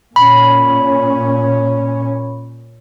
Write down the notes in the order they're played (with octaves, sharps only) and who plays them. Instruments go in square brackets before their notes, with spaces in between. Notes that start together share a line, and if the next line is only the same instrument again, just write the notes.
[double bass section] A#2 C#4 [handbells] B5